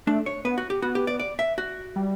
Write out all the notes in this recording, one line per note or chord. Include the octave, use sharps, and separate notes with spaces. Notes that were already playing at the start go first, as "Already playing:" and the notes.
A3 D4
C#5
B3 B4
F#4
G4
B3 F#4
G4
D5
D5
E5
F#4
G3